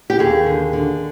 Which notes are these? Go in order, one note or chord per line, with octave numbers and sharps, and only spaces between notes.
G4
D#2 G#4
D3
D3